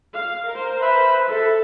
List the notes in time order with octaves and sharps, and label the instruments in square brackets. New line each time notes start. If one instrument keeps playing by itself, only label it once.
[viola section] F5
A#4 C5
[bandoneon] B4 E5 B5
[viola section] A4 [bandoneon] E5